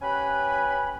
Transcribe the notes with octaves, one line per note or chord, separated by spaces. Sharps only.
C#4 G4 B4 F#5 G#5 B5